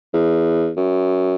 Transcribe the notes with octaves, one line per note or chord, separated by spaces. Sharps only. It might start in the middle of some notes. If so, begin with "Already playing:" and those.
E2
F#2